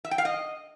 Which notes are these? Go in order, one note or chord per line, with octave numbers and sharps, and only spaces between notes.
E5
G5
F5
D#5